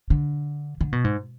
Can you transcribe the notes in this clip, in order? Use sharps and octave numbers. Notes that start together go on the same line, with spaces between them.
D3
D3
B2
G#2